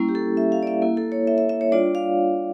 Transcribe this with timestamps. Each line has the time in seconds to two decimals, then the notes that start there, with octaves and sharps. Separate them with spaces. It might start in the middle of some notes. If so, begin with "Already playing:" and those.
Already playing: G3 A#3 C#4 E4
0.09 G4
0.15 A4
0.37 E5
0.52 F5
0.63 D5
0.67 E5
0.82 A#3 E4
0.97 A4
1.12 C#5
1.27 E5
1.38 E5
1.49 E5
1.61 C#5
1.72 G3 D4 F4 D5
1.95 F5